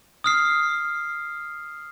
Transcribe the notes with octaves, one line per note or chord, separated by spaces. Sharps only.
D#6 F6 C7